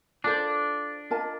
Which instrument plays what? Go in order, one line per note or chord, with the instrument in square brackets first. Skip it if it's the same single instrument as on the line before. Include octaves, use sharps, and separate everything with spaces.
[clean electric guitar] D4 [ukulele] F4 A4 C5
[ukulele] F4 A#4 D#5 A5